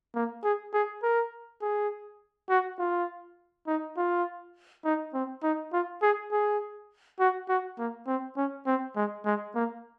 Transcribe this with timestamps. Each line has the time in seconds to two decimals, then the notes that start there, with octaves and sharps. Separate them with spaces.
0.15 A#3
0.44 G#4
0.74 G#4
1.03 A#4
1.62 G#4
2.50 F#4
2.79 F4
3.67 D#4
3.97 F4
4.85 D#4
5.14 C4
5.43 D#4
5.73 F4
6.02 G#4
6.32 G#4
7.20 F#4
7.49 F#4
7.78 A#3
8.07 C4
8.37 C#4
8.67 C4
8.96 G#3
9.25 G#3
9.55 A#3